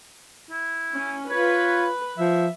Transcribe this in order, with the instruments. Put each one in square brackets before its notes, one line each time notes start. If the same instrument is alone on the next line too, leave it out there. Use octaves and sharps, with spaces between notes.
[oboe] E4
[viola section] C#4
[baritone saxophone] F4 [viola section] B4 [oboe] C#5
[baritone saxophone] F3 [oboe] E5